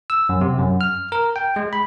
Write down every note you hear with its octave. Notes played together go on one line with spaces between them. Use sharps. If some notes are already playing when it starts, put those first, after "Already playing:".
E6
F#2
C3
F#2
F6
A#4
G5
G#3
B5